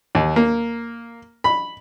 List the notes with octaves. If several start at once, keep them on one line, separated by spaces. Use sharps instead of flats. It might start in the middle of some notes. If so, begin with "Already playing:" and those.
D#2
A#3
B5